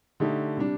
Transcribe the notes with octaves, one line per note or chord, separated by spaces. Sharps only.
D3 A3 D#4 G4
C3 G3 D4